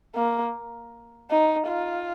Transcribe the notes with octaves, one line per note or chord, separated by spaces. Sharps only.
A#3
D#4
F4